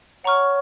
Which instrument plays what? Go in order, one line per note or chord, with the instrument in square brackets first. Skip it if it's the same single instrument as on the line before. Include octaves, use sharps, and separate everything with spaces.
[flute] C#5 [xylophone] F#5 A#5 C#6 F6